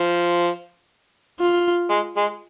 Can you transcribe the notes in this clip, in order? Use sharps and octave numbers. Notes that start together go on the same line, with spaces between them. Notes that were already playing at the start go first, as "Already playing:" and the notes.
Already playing: F3
F4
G#3
G#3